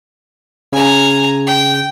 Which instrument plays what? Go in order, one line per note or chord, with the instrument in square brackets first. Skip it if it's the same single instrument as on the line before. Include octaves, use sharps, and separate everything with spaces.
[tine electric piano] C#3 [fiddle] G#5 A#5
[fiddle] G5